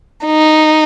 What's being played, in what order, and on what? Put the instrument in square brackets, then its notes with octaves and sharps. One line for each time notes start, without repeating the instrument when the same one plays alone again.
[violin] D#4